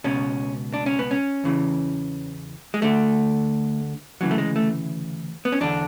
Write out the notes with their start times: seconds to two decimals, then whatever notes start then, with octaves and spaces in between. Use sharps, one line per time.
0.04 C#2 B2 C#4
0.74 D4
0.86 C#4
0.99 B3
1.11 C#4
1.44 E2 C#3 E3
2.74 G#3
2.82 D2 D3 A3
4.21 D2 C#3 E3 F#3
4.31 A3
4.38 G#3
4.56 A3
5.45 B3
5.52 C#4
5.61 E2 D3 D4